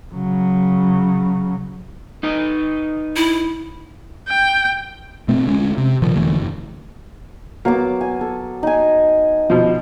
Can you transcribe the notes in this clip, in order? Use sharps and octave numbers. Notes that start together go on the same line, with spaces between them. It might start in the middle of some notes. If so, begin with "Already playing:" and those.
C#3 F#3
D#4 B4 D#5
E4
G5
B2 A3 C4
D2 G#3 C#4
C3
C2 A#2 D#3 F3
E1 D3 E3 A3
F#1
F#3 A#3 B3 D6
G#5
A4
D#4 G#5
B2 F3